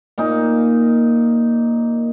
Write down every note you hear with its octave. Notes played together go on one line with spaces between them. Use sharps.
A#2 A#3 D#4